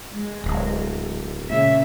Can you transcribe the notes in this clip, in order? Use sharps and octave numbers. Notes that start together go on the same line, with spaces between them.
G#3
D1
A#2 C#3 E5